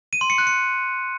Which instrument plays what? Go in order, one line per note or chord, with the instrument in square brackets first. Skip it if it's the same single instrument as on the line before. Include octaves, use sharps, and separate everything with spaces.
[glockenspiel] D#7
C6
C#7
F#6
C#7